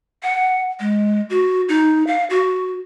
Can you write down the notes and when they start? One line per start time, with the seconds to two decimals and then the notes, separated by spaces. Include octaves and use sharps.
0.23 F#5
0.80 G#3
1.30 F#4
1.69 D#4
2.07 F5
2.30 F#4